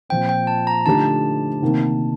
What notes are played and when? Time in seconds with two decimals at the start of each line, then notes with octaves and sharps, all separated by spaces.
0.09 A#2 F3 C4 G5
0.29 G5
0.47 A5
0.67 A#5
0.86 D3 F3 A3 D#4 G4 A5
1.62 C3 D#3 A#3